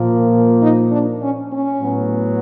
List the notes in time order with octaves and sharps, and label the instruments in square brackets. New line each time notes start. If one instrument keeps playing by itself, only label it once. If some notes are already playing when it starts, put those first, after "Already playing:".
Already playing: [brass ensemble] A#2 F3 A#3
D#4
D4
C#4
C#4
A2 F#3 B3